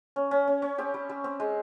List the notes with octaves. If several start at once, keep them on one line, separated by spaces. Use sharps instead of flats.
C#4
C#4
C#4
C#4
C4 G4
G3
G3
C4
G#3